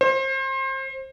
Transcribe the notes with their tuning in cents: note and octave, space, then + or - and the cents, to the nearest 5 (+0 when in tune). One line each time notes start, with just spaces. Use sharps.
C5 +30